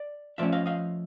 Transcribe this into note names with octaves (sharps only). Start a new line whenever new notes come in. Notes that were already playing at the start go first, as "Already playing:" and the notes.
Already playing: D5
F3 A3 C#4 D5 E5
D#5 F5
D#5 F5